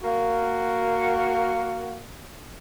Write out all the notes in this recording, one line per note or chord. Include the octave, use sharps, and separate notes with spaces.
A#3 F#4